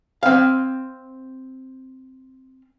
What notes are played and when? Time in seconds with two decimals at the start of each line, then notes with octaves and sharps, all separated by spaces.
0.23 C4 F5